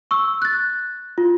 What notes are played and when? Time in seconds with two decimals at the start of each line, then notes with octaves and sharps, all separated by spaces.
0.11 C#6 E6
0.42 F#6 A6
1.18 F4